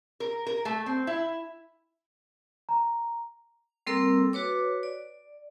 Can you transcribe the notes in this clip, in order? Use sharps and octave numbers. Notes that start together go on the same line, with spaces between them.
A#4
A#4
A3
C4
E4
A#5
G3 A#3 C4 A4 A#4 E6
F#4 B4 C#5 D6
D5